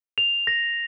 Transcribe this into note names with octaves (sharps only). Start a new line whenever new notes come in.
F7
A#6